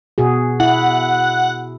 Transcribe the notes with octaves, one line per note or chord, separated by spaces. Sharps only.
B2 F#4 G#4
E4 F#5